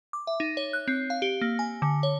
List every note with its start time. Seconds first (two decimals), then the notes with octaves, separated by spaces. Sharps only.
0.13 D6
0.27 E5
0.40 D#4
0.57 C#5
0.73 F#6
0.88 C4
1.10 F5
1.22 G4
1.41 A#3
1.59 G#5
1.82 D3
2.03 C#5